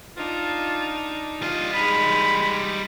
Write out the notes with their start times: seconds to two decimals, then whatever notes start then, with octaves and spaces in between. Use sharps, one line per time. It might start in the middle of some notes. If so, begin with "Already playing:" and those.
0.17 D4 D#4 F4
1.42 G3 F4 D#5
1.73 G#3 D#4 B5